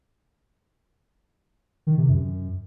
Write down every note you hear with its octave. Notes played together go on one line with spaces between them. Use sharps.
D#3
C3
F#2